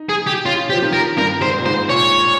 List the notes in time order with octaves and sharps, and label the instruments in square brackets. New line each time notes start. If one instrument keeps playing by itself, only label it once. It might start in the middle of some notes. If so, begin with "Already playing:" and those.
Already playing: [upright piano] D#4
[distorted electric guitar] G#4
G4
[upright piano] C#4 [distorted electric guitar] F4
[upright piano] F3 [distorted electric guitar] G4
[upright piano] D#3
[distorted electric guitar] A#4
[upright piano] G2 [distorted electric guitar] A#4
[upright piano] G#2 [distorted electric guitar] C5
[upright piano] A#2
[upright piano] G#2 [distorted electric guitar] C5
[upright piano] A#2 [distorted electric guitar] C#5